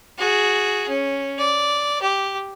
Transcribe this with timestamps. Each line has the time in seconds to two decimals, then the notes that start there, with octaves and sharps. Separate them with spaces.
0.18 F#4 G#4
0.88 C#4
1.38 D5
2.02 G4